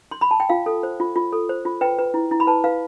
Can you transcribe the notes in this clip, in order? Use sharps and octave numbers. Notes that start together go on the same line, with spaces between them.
C6
B5
A5
G5
F4 F5
A4
C5
F4
F4
A4
C5
F4
B4 G5
B4
E4
E4
B5
B4 A5
B4 F5